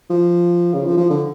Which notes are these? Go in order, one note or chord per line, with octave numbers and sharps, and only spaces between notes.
F3
C#3
F3
F3
D3